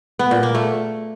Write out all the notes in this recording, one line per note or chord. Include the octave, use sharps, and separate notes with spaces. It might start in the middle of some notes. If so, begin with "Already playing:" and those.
B3
A#2
A#3
A3